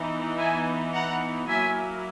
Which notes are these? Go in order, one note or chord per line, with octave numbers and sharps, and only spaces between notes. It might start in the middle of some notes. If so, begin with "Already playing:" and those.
Already playing: E3 B3 D#4
E5 G#5
F#5 A#5
F#3 A#3 E4 E5 G#5